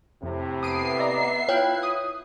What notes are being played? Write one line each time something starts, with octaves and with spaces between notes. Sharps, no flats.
F2 A2 C3
B3 E5 D#6 C7 D7 D#7
D5 D#5 A#5
E4 F4 C#5 F5 G5 F#6
D#6